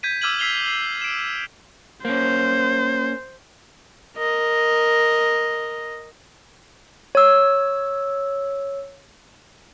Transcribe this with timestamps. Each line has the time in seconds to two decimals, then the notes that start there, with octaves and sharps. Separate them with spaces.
0.03 G6 G#6 B6 D#7
0.22 D6 E6 F6 G#6 D#7 F#7
0.39 E6 B6 C7 F7 G7
0.67 C7
1.02 D7 E7
2.05 A#3 C#4 C5
4.16 A#4 D#5
7.15 C#5 E6